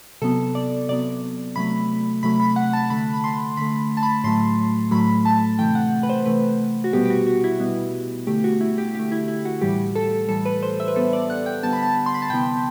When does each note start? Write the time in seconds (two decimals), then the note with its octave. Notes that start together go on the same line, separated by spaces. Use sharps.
0.22 C3 F#3 B3 A4
0.55 D5
0.89 C3 F#3 B3 D5
1.56 C3 F#3 A3 B5
2.23 C3 F#3 A3 B5
2.40 B5
2.56 F#5
2.73 A5
2.90 D3 A3 B5
3.13 B5
3.24 C6
3.57 D3 A3 B5
3.97 A5
4.03 B5
4.24 A2 F#3 A3 C6
4.91 A2 F#3 A3 B5
5.25 A5
5.59 C3 E3 A3 G5
5.75 F#5
6.03 B4
6.09 C5
6.26 C3 E3 A3 B4
6.84 F#4
6.93 B2 G3 B3 G4
7.06 G4
7.10 F#4
7.27 F#4
7.44 E4
7.60 B2 G3 B3
8.27 D3 A3 G4
8.44 F#4
8.61 E4
8.78 G4
8.95 D3 G4
8.99 A3
9.12 E4
9.28 E4
9.45 F#4
9.61 A2 E3 G3 G4
9.96 A4
10.28 A2 E3 G3 A4
10.45 B4
10.63 C5
10.80 E5
10.88 B4
10.96 D3 G3 B3 A4
11.13 D5
11.30 F#5
11.46 G5
11.63 D3 G3 B3 A5
11.73 B5
11.83 A5
12.06 C6
12.14 B5
12.22 A5
12.30 C3 E3 B3 G5